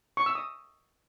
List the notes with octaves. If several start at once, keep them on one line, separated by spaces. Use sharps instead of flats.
C#6
E6
D#6